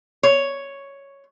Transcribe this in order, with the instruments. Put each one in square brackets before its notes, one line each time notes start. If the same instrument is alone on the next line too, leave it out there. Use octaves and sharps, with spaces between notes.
[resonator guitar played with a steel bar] C#5